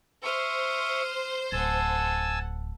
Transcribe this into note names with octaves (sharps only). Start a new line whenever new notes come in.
C5 E5 C#6 D#6 F6
D1 A4 F#5 G#5 A5 E6